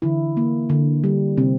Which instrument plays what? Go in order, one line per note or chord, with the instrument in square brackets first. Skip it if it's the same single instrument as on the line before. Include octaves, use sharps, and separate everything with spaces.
[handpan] D3 E3 E4
A#3
D3
G3
C3 C4